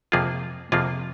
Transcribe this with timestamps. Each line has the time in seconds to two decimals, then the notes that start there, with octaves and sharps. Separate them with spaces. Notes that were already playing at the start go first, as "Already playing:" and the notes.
0.12 F2 C3 F3 A#3 F4 G#4
0.72 F2 C3 F3 A#3 F4 G#4